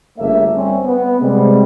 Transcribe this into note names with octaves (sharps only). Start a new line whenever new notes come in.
G1 C#3 A3 A#3 E5
G3 C4 C#4
B3
C3 G3 G#3